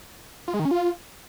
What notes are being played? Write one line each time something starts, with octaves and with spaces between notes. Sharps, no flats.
F4
G#3
D#3
C#4
F4